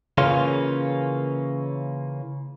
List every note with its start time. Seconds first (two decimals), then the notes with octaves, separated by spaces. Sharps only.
0.18 C#3 E3 A#3 C#4 F4